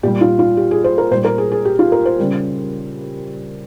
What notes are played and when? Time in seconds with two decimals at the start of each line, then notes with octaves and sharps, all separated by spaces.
0.03 A#2 G3 G4
0.21 F4
0.39 F4
0.57 G4
0.71 G#4
0.84 C5
0.98 A#4
1.11 A#2 C5
1.15 G3
1.25 A#4
1.38 G#4
1.52 G#4
1.65 G4
1.79 F4
1.92 A#4
2.06 C5
2.20 C#3 G3